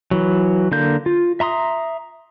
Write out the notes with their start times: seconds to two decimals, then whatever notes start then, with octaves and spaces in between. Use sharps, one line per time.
0.11 E3 F#3
0.72 D3 A#3 G6
1.06 F4
1.40 E5 A#5 C6 D#6